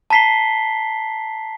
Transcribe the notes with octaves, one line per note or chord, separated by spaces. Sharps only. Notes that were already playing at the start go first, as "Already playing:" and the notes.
A5 A#5 B6 C7 G7